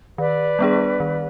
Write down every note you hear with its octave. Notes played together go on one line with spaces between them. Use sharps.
D#3 B4 D5
G3 B3 D4 G#4
D#3